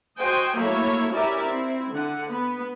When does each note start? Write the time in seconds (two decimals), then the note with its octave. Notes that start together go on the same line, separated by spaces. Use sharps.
0.18 F#4 C5 D#5 G5 G#5
0.56 F#3 A3 A#3 E4 A4 C#5
1.12 C#4 E4 G4 A#4 D5 E5
1.47 C4 E4
1.91 D3 F#5
2.29 B3 B4